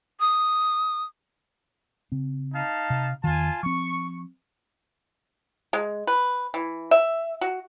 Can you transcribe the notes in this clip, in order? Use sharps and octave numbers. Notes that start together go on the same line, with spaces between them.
D#6
C#3 C4
D#4 F5 A5
C3
E2 D#3 F4 G#5 A5
F3 C4 C#6
G#3
B4
E3
E5
F#4